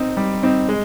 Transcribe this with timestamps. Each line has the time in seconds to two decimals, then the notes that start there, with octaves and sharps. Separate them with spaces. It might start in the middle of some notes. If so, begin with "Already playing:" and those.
Already playing: C4 D#4
0.17 G3
0.43 C4 D#4
0.69 G#3